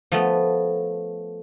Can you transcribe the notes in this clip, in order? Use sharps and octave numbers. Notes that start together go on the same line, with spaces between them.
F3 A3 B3